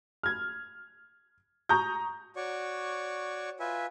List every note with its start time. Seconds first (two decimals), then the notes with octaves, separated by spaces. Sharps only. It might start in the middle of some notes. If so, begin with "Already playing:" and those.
0.23 F6 G#6
1.69 A#5 C#6 D#6 G6
2.36 F#4 C#5 D5 C#6
3.60 F4 B4 E5 G#5